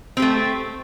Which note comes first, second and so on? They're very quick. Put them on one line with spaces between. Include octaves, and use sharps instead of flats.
C4 G4 A3